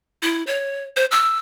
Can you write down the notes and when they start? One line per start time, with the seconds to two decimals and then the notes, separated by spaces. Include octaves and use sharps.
0.22 E4
0.47 C#5
0.96 C5
1.11 E6